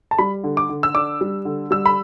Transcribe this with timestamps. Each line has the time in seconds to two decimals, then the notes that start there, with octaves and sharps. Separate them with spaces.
0.11 A5
0.18 G3 B5
0.44 D3
0.57 D6
0.69 D3
0.83 E6
0.94 D4 D6
1.21 G3
1.45 D3
1.71 G3 E6
1.86 B5